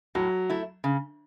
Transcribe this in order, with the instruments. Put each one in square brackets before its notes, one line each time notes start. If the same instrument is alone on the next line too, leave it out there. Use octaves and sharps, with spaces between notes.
[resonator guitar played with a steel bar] A2 [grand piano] F#3
[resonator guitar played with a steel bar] A3 E4
C#3